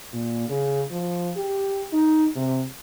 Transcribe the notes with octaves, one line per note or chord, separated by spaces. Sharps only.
A#2
C#3
F3
G4
D#4
C3